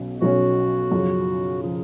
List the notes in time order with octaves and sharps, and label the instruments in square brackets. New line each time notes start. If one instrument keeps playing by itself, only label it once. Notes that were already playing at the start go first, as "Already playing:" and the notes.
Already playing: [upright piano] B1 B2 C#4
[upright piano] B1 B2 F#3 C#4 [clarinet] F#4
[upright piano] F#2 C#3 F3
[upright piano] C#3 F3 [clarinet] G#4